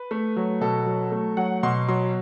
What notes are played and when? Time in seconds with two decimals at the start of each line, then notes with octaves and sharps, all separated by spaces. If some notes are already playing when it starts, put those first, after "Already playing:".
Already playing: B4
0.11 A3
0.36 F#3
0.61 B2 A4
0.86 F#3
1.12 A3
1.37 F#3 F#5
1.63 B2 C6
1.88 F#3 C6